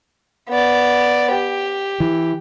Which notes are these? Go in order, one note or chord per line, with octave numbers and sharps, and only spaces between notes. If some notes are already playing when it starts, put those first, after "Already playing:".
B3 D5
G4
E3